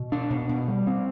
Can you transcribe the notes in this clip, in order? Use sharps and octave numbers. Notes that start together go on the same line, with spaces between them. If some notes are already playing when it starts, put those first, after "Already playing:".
Already playing: B2
D4
B2
B2
G3
C4